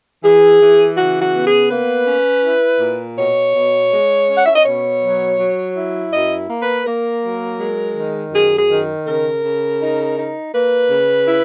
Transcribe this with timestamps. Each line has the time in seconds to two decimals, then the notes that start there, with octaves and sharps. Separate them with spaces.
0.23 E3 G#4
0.61 E3
0.97 C#3 F#4
1.22 F#4
1.34 B3
1.45 G#4
1.70 A#3 B4
2.07 C#4
2.44 E4
2.81 A#2
3.18 B2 C#5
3.54 B2
3.92 G#3
4.28 C#4
4.36 F#5
4.46 E5
4.55 D#5
4.64 B2 C#5
5.02 F#3
5.39 F#3
5.76 E4
6.12 F#2 D#5
6.49 A#3
6.62 B4
6.85 A#3 A#4
7.23 F#3
7.59 G#3
7.96 D#3
8.32 F#2 G#4
8.57 G#4
8.69 D#3
9.07 C#3 A#4
9.44 C#3
9.81 D#4
10.17 D#4
10.53 A#3 B4
10.90 C#3
11.27 E4